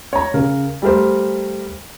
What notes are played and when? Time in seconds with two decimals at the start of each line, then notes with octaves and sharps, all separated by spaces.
0.13 C#5 A#5
0.34 C#3 A#4
0.82 G3 A3 A#4 C5